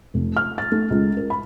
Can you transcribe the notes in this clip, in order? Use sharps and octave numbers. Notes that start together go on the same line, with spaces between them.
F1
F6
A6
A3
C#2
A#4
B5